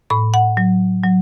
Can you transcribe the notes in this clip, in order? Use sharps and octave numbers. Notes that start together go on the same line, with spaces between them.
A2 B5
F#5
F#3
F#3